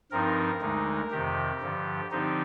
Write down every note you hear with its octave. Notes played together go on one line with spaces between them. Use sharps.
G2 F3 C4 D#4 A#4
D2 D3 G#3 D#4
F2 C3 D#3 G4
G2 D3 F3
D3 F3 C4 D#4 G4